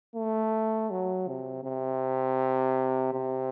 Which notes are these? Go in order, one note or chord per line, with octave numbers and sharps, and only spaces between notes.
A3
F#3
C3
C3
C3